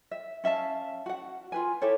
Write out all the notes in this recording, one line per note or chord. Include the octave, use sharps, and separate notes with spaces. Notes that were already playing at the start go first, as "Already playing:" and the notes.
E5
C#4 E5 F5 A5
F#4 F#5
F4 B4 G#5
E4 G4 A4 C#5